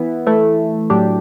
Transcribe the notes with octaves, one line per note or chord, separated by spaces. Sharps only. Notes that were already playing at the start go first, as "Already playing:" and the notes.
Already playing: E3 B3 E4
E3 A3 E4
A2 F#3 A3 D4 G4